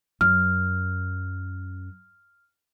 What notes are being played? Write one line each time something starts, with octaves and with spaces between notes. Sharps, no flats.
F#2 F6